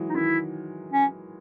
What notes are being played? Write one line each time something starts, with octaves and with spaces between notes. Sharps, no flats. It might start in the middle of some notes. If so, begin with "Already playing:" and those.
Already playing: E3 F#3 G#3
D#4
D#3 E4
C#4